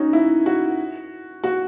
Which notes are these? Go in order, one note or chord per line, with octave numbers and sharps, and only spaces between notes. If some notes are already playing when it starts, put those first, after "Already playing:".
Already playing: C#4 D#4 F#4
E4
F#4
F#4